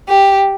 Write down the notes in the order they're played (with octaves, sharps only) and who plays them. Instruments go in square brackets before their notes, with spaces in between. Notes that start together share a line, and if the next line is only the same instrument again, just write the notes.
[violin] G4